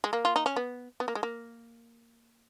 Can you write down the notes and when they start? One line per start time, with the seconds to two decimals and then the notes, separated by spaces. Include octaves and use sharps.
0.04 G#3
0.13 A#3
0.25 F4
0.36 D#4
0.46 C#4
0.56 B3
1.00 B3
1.08 A#3
1.15 G#3
1.23 A#3